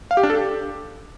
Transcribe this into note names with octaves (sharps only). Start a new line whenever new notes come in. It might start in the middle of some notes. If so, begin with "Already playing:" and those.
F5
G4
D4
A4
G4